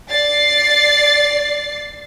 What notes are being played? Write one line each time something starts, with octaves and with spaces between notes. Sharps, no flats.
D5 A6 C7